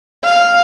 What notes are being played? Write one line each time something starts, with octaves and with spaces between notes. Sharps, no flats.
F5